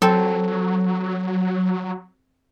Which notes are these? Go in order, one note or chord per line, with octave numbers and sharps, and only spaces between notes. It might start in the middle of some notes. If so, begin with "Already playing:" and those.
F#3 C4 A4